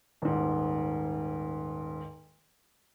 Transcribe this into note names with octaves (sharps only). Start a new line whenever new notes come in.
D#1 G#2